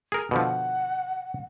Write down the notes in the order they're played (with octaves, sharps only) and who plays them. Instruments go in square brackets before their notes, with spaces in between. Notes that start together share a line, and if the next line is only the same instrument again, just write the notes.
[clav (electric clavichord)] G#4 A#4
[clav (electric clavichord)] B2 D3 F3 [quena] F#5